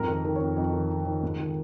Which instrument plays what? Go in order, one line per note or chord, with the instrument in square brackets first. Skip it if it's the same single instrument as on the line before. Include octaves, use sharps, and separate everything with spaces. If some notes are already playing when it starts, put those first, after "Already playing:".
Already playing: [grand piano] F2 G#2 A#4
D#3
A#4
D#3
F2 C#5
F2 D#5
D#3
D#3
D#3
G#2
D#3